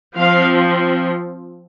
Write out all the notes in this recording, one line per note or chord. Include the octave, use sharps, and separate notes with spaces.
F3 C4 F5